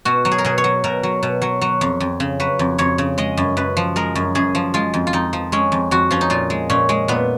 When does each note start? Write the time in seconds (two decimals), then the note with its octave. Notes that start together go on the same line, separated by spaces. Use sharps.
0.05 B2 F#4
0.25 F#3
0.31 G#4
0.38 A#4
0.45 B2 G#4
0.58 C#5
0.64 F#3
0.84 B2 A#4
1.03 F#3
1.23 B2
1.42 F#3
1.61 F#3
1.81 F2
2.00 F2
2.20 C#3
2.40 F#3 B4
2.59 F2
2.78 F2 C#5
2.98 C#3
3.18 G#3 D#5
3.37 F#2
3.57 F#2 B4
3.77 F3
3.96 G#3 A#4
4.15 F#2
4.35 F#2 G#4
4.55 F3
4.74 G#3 F4
4.94 F2
5.07 F4
5.13 F2 D#4
5.33 F3
5.52 G#3 C#4
5.72 F2
5.91 F2 F#4
6.11 F3 C#4
6.21 D#4
6.30 A#2 F4
6.50 G#3
6.70 A#2 C#4
6.89 G#3
7.08 A#2 B3